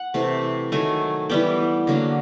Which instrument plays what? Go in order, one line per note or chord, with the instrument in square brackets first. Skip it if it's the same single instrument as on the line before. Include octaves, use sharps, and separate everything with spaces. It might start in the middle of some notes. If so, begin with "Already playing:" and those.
Already playing: [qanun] F#5
C3 E3 A3
D#3 F#3 A3 G#5
E3 G3 B3 G5
D3 F#3 A#3